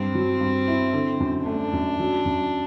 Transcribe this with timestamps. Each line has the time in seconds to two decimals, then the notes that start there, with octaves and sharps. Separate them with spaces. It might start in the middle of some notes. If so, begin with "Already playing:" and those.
Already playing: G2 C4
0.15 F#3
0.41 G2
0.68 E4
0.93 D3
1.20 F#2
1.46 A3 D4
1.73 F#2
2.00 F#3
2.26 F#2